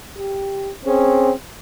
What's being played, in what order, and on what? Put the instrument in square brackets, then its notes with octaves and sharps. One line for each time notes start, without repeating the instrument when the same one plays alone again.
[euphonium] G4
[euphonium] C4 [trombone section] C#4 G#4